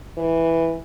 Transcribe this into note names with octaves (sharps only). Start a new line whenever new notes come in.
E3